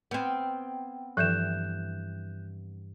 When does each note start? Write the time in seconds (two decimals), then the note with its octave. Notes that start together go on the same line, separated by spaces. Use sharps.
0.11 B3 C4 G5 F6 G#6
1.17 G2 E3 F3 A4 E5 F#6 G6 E7